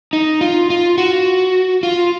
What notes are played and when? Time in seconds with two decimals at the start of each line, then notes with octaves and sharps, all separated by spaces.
0.13 D#4
0.41 F4
0.70 F4
0.98 F#4
1.83 F4